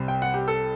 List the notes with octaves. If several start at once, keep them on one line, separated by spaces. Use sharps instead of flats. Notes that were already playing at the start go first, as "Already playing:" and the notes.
Already playing: C2 C3 G3 C4
G5
F#5
G4
A4